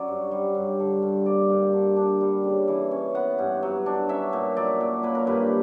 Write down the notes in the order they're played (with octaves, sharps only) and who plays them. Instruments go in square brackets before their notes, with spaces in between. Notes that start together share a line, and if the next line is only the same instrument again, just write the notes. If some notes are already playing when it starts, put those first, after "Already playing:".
Already playing: [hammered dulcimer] F#3 C#4 D5
G2
G3
G2
D3
G2
A#3 D5
G2
D3
D4
G3
C#3
E3
C#4
B3 F#5
G2
F#3
D4
C#4 E5
A#2
F#3 D5
A#2
A#3 B4
A#4
G2 B4